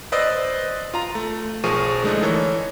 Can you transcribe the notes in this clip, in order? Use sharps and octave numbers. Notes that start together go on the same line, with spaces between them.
B4 C5 D5 D#5 E6
F4 A#5
A3
B1 F3 G#4 A#4 C#6 D#7
D3 G#3 A3 D4 D#4
E3 A4 A#4 C#5